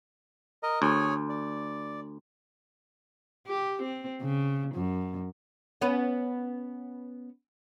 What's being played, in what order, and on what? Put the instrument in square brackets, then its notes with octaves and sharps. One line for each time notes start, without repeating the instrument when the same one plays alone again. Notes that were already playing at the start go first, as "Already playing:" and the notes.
[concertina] A#4 D#5
[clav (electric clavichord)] D2 [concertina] G#4 C#5 G#5
[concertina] D5
[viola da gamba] G4
C4
C#3
F#2
[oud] B3 C#4 B4